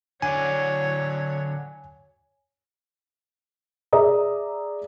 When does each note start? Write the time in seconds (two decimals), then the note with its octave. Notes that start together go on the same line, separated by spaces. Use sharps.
0.22 D3 F#3 C#5 D5 G#5
3.93 G#4 D5 E5 A#5 D#6